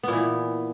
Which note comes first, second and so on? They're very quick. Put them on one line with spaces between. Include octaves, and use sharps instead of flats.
B3 A#2 E3